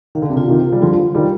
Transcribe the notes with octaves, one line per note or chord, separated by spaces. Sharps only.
D#3 F5
D3
C3
D3 F4
C3 D#3
C5
G3
D3 F3 F4
F5
D#3 G3